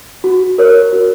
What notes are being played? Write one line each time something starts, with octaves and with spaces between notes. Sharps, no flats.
F#4
A#4 C#5
F#4